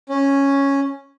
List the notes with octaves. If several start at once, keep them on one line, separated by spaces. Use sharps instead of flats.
C#4